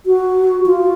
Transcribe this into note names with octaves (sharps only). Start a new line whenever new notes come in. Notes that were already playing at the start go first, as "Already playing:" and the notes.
F#4
F4